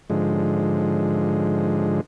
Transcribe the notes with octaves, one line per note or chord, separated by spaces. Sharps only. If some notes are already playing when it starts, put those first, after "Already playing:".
G#2 D3 F3 G#3